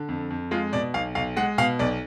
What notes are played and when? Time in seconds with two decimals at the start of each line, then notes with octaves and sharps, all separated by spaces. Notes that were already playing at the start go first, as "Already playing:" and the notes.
Already playing: D3
0.09 F2
0.30 F2
0.51 G#3 F4
0.73 B2 D5
0.94 B1 F5
1.15 B1 F5
1.36 G#3 F#5
1.58 B2 F5
1.79 B1 D5